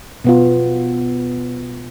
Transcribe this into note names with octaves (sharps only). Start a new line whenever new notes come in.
B2 B3 F4